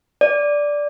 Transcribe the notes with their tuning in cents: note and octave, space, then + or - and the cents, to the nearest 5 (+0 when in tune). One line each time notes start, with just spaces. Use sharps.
D5 -5